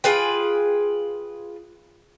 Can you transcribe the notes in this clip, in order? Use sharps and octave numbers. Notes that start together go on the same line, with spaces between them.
F4 G#4 B4 G5